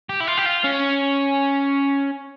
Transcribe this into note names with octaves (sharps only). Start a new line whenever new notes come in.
G4
E4
F4
G4
F4
C#4